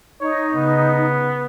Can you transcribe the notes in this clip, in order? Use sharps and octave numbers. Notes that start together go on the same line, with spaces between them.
D#4 C#5
C#3 B3